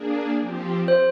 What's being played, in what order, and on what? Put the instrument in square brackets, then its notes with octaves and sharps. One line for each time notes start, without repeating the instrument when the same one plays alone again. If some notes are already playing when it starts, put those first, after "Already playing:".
Already playing: [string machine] A#3 D4 G#4
F3 C4 G4
[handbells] C5